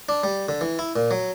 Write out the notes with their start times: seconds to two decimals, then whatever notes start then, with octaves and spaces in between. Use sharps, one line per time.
0.09 D4
0.24 G3
0.49 D3
0.61 E3
0.79 E4
0.96 A#2
1.11 F#3